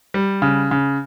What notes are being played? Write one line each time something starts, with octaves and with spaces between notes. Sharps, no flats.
G3
C#3
C#3